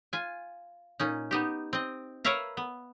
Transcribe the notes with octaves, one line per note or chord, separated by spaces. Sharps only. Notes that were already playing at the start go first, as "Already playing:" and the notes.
F4 G#5
A#2 C#4 D#4
B3 D#4 G4
C4 D#5
A#4 B4 C#5 E5 F5 A#5
B3